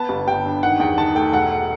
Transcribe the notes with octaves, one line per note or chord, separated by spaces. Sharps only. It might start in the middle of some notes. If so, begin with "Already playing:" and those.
Already playing: B3 A5
G1
G1 G5
G2
D#3 F#5
E2 G5
D#3 A5
A3 G5
E1 F#5